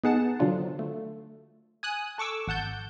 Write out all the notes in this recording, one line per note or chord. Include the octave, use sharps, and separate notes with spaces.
B3 D#4 G#4 F#5 A5
D3 F3 F#3 D4 F4
A3
G#5 D#6 F#6
A4 C#6 D6 E6
G#1 F#5 A5 G6